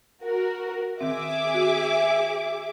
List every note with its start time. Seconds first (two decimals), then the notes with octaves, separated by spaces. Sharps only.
0.22 F#4 A#4
1.01 D#3 C4 G#4 E5 D6
1.54 F#4